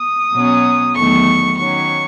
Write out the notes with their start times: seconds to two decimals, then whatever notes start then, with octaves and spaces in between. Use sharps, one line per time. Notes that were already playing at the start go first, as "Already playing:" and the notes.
Already playing: D#6
0.33 B2 F#3 C#4
0.95 E2 D#3 F#3 A3 C#6
1.58 D#3 F#3 C#4 C#6